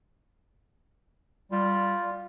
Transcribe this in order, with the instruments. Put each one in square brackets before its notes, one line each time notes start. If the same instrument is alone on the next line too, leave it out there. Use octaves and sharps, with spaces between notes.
[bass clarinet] G3 [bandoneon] F4